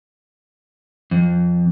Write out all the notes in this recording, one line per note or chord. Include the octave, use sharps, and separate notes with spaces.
F2